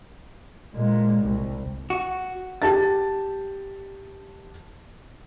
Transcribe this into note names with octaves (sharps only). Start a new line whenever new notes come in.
A#2 G#3
C2
F#4
G4 A5 A6